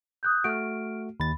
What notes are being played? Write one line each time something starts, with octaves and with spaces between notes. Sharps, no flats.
D#6 F#6 G6
A3 F#4 F6 D7
D#2 B5 A6